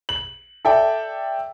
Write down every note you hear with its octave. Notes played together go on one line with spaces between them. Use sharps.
F#7
A4 D5 E5 G5